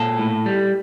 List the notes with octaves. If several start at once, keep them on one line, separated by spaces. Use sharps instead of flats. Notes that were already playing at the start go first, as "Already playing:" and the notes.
Already playing: A#2 A4
A2
G3